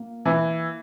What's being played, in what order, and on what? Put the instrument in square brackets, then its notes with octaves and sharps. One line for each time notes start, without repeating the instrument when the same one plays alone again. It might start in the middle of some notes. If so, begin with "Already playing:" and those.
Already playing: [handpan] A#3
[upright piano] E3